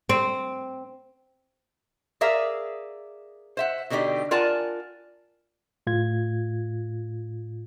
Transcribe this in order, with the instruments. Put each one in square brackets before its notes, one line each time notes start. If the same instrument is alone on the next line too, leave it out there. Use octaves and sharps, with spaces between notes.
[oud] C4
[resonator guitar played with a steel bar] G#4 A#4 D5 E5 F5
C5 E5 F#5
B2 D3 D#4 G4 D5
F4 A#4 D5 F#5 G#5 A5
[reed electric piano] A2 F4 G#6